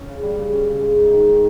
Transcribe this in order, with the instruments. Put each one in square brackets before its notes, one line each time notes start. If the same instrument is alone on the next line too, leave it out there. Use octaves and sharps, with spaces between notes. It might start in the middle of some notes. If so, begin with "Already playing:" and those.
Already playing: [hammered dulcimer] C#4
C#3
G3
C#3
C#4
C#3
G#3
D#4
D#3